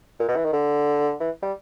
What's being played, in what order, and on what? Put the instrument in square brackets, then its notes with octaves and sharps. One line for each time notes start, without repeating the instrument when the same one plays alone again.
[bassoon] A#2
B2
E3
D#3
D3
E3
G3